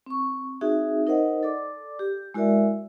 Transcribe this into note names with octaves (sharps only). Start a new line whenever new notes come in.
C4 C#6
C4 D#4 F#4 G#4 E5
D#4 A#4 C5 D#5 F#5
A4 D5 D6
G4
G#3 E4 F#4 A#4 D5 E5